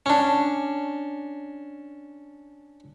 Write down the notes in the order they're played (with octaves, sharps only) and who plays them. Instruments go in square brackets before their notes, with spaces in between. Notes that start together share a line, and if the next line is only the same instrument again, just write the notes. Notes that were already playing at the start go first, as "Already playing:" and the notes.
[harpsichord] C#4 D4